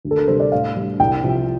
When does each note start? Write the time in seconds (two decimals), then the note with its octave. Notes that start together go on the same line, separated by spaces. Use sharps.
0.05 D2
0.11 A4
0.17 A#4
0.28 C3 G3 D4 C5
0.40 D5
0.52 A2 F5
0.76 G3 D4
1.00 C2 G5
1.24 C3 F3